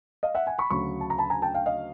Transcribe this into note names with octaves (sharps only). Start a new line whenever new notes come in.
D#5 F5
E5 F#5
F#5 G#5
B5 C#6
D2 C#3 F#3 B5 C#6
A5
A#5
A5 B5
G#5 A#5
G5 A5
F5 G5
D#5 F5